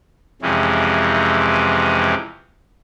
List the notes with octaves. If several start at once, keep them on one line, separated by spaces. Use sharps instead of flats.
F2 C3 E3 G#3 C#4